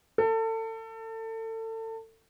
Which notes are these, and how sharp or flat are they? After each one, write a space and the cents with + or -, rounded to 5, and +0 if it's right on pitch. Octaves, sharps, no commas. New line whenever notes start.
A4 +30